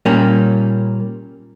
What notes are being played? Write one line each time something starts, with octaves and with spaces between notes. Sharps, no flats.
A#2 G3 A#3 C#4